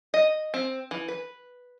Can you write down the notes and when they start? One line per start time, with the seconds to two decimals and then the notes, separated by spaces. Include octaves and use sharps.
0.14 D#5
0.54 C4
0.91 E3
1.08 B4